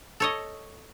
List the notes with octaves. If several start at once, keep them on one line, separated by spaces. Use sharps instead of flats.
A4 C#5 D#5